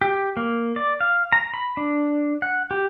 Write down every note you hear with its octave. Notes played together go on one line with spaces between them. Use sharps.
G4
A#3
D5
F5
A#5
B5
D4
F#5
G4